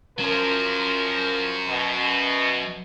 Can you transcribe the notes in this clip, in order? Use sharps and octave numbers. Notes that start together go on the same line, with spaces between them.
F3 F#3 C#4 A#4
B2